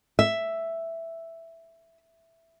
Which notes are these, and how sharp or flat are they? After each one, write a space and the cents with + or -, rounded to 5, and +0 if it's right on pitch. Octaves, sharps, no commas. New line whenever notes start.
E5 +5